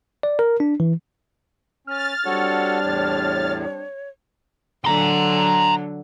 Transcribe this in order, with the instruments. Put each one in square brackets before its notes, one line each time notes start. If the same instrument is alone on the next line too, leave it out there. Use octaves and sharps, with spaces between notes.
[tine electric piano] D5
A#4
D4
E3
[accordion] C#4 [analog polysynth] F6 A6
[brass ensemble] G3 C4 D4 [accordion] F#4 A4 C#5 [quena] F#5
[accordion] E2 A2 [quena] C#5
[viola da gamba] D3 F#3 [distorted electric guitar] A#5 C6